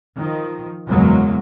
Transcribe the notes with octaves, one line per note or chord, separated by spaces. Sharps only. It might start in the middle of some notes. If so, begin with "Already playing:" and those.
D#3 F3
F#1 E2 B2 F#3 G#3 A#3